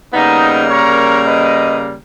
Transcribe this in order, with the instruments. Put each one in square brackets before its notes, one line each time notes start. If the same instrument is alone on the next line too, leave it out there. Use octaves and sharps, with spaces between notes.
[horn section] C#3 G3 A#3 B3 D#4
A#4 C#5
B4 D#5